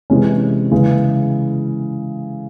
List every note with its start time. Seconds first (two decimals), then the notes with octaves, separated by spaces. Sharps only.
0.10 C3 E3 G#3 C#4
0.71 C#3 E3 G#3